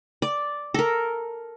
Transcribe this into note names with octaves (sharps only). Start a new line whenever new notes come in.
D5
A4 A#4